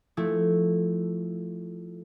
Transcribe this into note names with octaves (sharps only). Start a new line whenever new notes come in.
F3 A3 E4